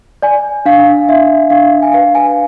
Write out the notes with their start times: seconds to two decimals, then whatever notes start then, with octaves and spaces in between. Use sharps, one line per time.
0.22 D5 G#5
0.66 D4 F5
1.09 D4 E5
1.50 D4 F5
1.82 G#5
1.93 B4 F5
2.15 G#5